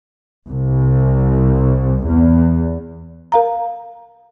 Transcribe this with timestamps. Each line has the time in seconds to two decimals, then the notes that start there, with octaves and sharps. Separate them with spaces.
0.48 C2
2.06 E2
3.32 A#4 F5 A#5